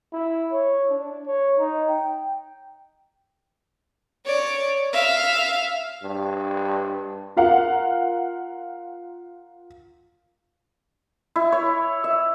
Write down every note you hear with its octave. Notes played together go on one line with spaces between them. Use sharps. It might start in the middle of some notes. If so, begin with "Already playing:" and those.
E4
C#5
D4
C#5
D#4
G5
C#5 D5
E5 F5
G2
F4 A#4 F5 F#5
E4
C#5
E5